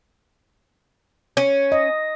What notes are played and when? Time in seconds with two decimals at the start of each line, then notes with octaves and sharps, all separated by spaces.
1.37 C#4
1.72 D#5